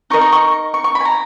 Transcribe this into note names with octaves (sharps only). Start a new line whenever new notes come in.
D#4 A#4 D#5 C#6
C#6
C#6
C#6
C#6
B5
G#5
A#5